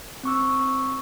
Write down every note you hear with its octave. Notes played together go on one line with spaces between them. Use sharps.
C4 C#6 E6